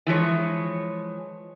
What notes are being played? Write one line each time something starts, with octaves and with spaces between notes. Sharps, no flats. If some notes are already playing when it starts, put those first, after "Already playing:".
E3 F3 G#3 C#5